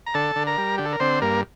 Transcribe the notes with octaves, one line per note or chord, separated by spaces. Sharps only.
A#5
D3 A4 A5
D3
A#4 A#5
G3
D3 G4
A4
A#4
D3 C4 C5
G2 A#3 A#4